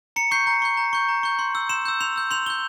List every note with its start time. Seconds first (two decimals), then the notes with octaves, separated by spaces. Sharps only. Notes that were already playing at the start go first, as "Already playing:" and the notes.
0.16 A#5 C#7
0.31 C#6 G6 C7
0.47 A#5
0.62 C#6 G6
0.77 A#5
0.93 C#6 G6
1.09 A#5
1.23 C#6 G6
1.39 C6
1.55 E6 G6
1.69 C6 E7
1.85 E6 G6
2.01 C6 F7
2.16 E6 G6
2.31 C6 F7
2.46 E6 G6 G7